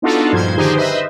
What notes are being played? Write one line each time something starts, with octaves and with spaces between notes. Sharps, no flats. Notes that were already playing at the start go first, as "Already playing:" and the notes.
B3 D4 D#4 F4 F#4 A4
G2 A#2 F3 C5 G#6
D3 D#3 D#4 G4 G#4 C5
B4 C5 D#5 E5